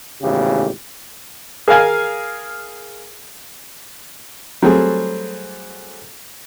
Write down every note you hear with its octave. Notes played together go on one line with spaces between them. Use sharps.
G#1 E2 A2 C#3 G4
G#4 A#4 F5 G#5
F#3 G3 A3 C4 G#4